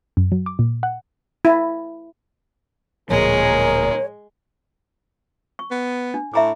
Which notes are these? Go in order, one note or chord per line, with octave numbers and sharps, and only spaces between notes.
F#2
F#3
D6
A#2
F#5
E4
D1 A#2 F3 G#3 G#4 A#4 C#5
C#6
B3
D4
A2 E5 A#5 D6